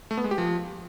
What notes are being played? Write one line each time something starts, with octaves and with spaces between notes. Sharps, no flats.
A3
B3
G#3
G4
F3